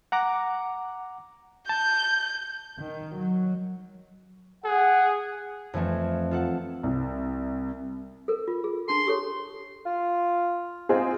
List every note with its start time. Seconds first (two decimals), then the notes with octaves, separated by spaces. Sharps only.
0.12 F#5 A#5 D6
1.69 A5 G6
2.79 D#3
3.16 F#3
4.65 G#4 F#5
5.74 F2 E3 F3 A3 C4
6.31 F4 A4 F#5 A5
6.83 C2
8.28 A4 A#4
8.48 F4
8.64 G#4
8.88 D4 A5 C6
9.07 G4 A4 C#5
9.86 F4
10.89 G#2 C4 F4 G#4